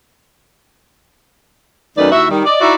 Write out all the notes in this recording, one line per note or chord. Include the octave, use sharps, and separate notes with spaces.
F#2 D#3 A3 D#4 B4 D5
D#2 E4 F#4 E5
D#3 G3
D5 D#5
D#4 E4 F#4 D5 E5